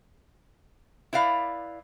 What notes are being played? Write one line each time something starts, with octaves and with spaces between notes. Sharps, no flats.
E4 B4 D5 F5